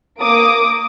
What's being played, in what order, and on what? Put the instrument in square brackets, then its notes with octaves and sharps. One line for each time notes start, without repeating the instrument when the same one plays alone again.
[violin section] A#3 D6 D#6 D7